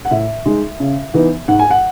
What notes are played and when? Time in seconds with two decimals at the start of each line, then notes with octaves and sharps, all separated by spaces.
0.05 F#5
0.11 A2 E5
0.45 G#3 D#4
0.80 C#3
1.14 E3 B3 D#4
1.48 G#2 F#5
1.59 G#5
1.70 F#5